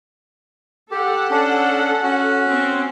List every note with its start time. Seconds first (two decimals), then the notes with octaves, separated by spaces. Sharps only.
0.91 G4 A4 F#5
1.31 C#4 D4
2.03 C#4 F#4
2.49 C4